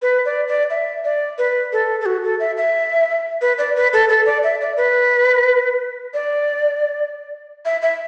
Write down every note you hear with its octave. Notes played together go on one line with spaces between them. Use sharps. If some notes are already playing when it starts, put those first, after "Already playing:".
B4
D5
D5
E5
D5
B4
A4
A4
F#4
A4
E5
E5
B4
D5
B4
A4
A4
D5
E5
D5
B4
D5
E5
E5